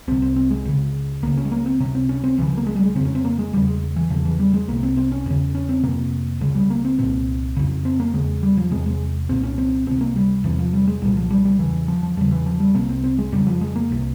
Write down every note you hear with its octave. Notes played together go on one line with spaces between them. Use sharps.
C2 C3 C4
C4
C4
G#3
C#2 C#3
C#2 C#3 A#3
C#4
G#3
A#3
C4
C#2 C3 C#4
C4
C#4
C4
C#2 C#3 E3
F3
A#3
G#3
G3
G#3
F2 C#3 C4
C#4
C4
A#3
G#3
E2 C#3 G3
G#3
E3
E2 C#3 F3
E3
G3
G#3
C2 C3 A#3
C4
C4
C#4
E2 C#3
C#4
C4
F2 C3 A#3
C#2 C#3 G#3
G3
A#3
C4
C2 A#2 C4
F2 C#3
C4
A#3
E2 C#3 G#3
G3
F3
E2 C3 G#3
G#3
C2 A#2 C4
C#4
C4
C#2 C3 C4
A#3
G3
E2 C3 E3
F3
G3
G#3
C2 A#2 G3
F3
G3
G3
E2 C#3 E3
F3
F3
E2 C#3 G3
E3
F3
G3
C2 C3 A#3
C4
C4
G#3
F2 C#3 G3
F3
G#3
A#3
C2 C3